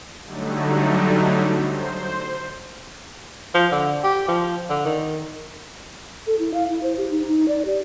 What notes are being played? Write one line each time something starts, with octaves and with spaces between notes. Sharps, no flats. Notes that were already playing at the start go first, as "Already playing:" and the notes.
D3 F#3 G3 A3 D#4
C5
F3
D3
G4
F3
D3
D#3
A4
E4
F5
E4
C5
G4
D#4
D#4
D5
G4